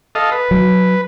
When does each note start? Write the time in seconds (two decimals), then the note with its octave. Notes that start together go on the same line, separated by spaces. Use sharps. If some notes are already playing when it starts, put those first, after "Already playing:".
0.15 A4 D#5 F5
0.32 B4
0.51 F#3